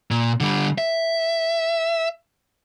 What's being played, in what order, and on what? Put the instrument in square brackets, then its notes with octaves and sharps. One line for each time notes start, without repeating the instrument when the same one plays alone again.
[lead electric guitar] A#2
D3 G3
E5